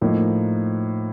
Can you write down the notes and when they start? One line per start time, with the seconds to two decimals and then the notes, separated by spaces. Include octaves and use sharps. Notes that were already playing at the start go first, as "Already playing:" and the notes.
0.01 A2 F3 A#3 D#4